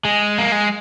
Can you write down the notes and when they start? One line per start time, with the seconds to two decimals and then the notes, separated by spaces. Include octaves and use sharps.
0.05 G#3
0.38 A#3
0.52 G#3